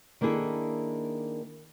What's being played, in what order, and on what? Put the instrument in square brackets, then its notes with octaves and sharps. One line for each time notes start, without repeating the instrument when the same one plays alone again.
[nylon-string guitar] D#3 A#3 D4 E4 G#4 A4